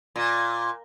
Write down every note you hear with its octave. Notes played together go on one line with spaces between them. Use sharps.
A#2